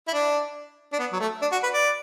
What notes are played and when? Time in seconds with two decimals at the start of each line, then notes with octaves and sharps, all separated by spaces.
0.08 E4
0.14 D4
0.93 D4
0.99 B3
1.13 F#3
1.20 A3
1.42 D4
1.52 F#4
1.63 B4
1.74 D5